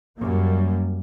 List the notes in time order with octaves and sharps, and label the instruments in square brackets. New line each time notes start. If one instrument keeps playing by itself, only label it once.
[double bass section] F#2 G3 A#3